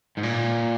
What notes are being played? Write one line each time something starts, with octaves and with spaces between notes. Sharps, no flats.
G#2
A#2